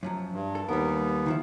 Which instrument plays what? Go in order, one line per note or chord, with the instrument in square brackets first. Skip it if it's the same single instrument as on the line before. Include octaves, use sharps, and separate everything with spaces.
[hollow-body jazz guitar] F#2 F3 F#3
[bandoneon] G2
[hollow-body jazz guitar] A4
[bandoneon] D#2 B3 [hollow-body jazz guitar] G3 A#4
[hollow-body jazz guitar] D#3 F3 E4